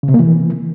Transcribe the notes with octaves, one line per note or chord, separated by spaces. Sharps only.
C#3
C3
A#3
E3